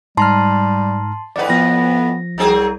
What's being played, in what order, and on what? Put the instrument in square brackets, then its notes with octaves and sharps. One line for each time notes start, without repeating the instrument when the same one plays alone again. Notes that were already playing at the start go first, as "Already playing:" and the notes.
[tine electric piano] G#2 A#5 F6 [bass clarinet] G3 [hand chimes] A5 C6
[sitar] F2 A2 B4 [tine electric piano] D5 F#5
[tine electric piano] F3 [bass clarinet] B3 [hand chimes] A#6
[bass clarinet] C2 [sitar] F#3 C4 G#4